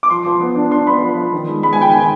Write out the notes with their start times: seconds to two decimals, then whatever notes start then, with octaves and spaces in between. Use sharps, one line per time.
0.03 D6
0.10 F3 C6
0.26 F3
0.41 B3
0.56 D4
0.72 D4 C6
0.87 B3 B5
1.02 F3
1.17 F3
1.32 D#3
1.48 G#3
1.63 G#3 B5
1.73 G#5
1.78 D#3 G5
1.92 D#3 G#5